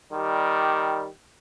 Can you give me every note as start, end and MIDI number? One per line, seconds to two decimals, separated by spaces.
0.12 1.08 51
0.12 1.08 55